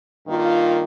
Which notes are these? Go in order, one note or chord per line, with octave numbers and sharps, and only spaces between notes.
G2 D#3 A#3 F4